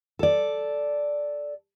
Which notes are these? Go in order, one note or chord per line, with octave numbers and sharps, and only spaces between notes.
A4 D5